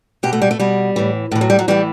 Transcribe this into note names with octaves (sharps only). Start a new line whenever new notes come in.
B2 G4
A3
G3
A3
B2 G3
A2 E3
A2 E3
F#3
G3
F#3
A2 E3 G3